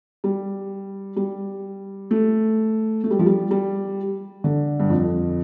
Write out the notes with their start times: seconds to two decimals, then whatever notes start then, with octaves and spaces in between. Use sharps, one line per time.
0.24 G3
1.16 G3
2.11 A3
3.04 A3
3.11 G3
3.19 F3
3.26 G3
3.51 G3
4.44 D3
4.80 G2
4.90 F2